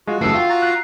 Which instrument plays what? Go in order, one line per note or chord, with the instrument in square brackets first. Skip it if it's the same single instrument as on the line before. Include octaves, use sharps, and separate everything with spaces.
[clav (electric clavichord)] G#3 F4 [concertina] F#4
[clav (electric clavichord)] F#2 C#3 E3 [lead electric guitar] A3 A4 [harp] E6 C7
[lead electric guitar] F4 [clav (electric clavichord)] E5 G5
[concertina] F#4 A#5 [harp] A6
[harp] F#6 C7